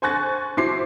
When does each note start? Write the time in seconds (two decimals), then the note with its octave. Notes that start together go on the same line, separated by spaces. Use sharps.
0.02 C5 G#5 C#6 F#6 A6
0.57 F#3 E4 C5 D6 C7